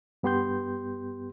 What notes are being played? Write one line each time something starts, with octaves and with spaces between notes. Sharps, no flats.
G2 B3 G4 C6 G6